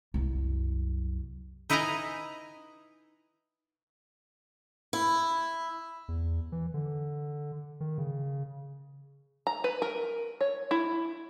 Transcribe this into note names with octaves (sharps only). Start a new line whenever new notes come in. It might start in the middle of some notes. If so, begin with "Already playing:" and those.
C2 F#2
D#4 E4 B4 D#5 G#5 A#5
E4
E2
E3
D3
D#3
C#3
A#5
B4
A#4
C#5
E4